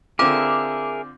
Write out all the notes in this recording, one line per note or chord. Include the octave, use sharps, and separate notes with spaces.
D3 C4 F4 G#4 A#4 E5 D6